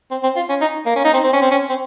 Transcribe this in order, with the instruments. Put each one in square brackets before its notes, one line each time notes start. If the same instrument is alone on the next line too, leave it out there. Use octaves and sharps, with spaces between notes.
[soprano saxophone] C4
C4
F4
C#4
D#4
A#3
C#4
D#4
C4
C4
C#4
C4
C#4
C4